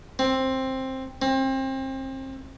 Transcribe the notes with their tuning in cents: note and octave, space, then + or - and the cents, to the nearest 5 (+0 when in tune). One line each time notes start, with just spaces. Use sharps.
C4 +10
C4 +30